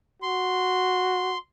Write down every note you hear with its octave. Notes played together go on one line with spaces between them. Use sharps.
F#4 C6